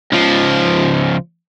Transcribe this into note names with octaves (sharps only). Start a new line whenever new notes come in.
C#2 F3